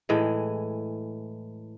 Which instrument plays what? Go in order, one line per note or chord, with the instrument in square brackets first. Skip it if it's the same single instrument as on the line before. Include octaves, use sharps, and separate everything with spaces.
[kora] A2 E3 G#3